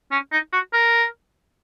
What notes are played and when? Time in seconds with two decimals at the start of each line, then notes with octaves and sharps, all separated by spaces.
0.12 C#4
0.32 D#4
0.53 F#4
0.73 A#4